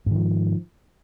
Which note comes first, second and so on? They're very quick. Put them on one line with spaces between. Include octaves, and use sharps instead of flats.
G#2 D#3 F3